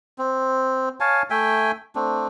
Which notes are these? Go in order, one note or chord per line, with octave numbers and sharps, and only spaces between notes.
C4
C#5 F5 G#5 A5
A3 E5 G5 G#5
A3 C4 D4